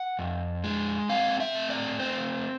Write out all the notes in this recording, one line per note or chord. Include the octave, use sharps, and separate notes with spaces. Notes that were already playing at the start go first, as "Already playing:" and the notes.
Already playing: F#5
F2
G#3
C4 F5
E5
A3
D5
C4 C5